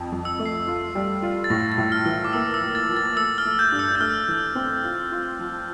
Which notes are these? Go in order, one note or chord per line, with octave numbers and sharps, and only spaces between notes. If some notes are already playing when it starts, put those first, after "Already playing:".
Already playing: F2
F2
E6
A3
C7
F4
G3
F4
A6
A2 A#6
A6
A2
F6
E3
D6
A#3 E6
E6
F3
A6
F3
A6
A3 E6
F6
A3
G6
G2
E6
G6
A3 F6
E3
C4
F4
F4
F3